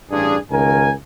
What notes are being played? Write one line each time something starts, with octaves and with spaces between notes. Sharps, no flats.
A1 G2 D4 G#4
C#2 D#3 A#4 G#5